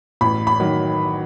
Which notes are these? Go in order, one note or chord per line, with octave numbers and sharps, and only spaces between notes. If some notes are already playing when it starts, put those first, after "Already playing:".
A1 B5
B5
D#3 F#3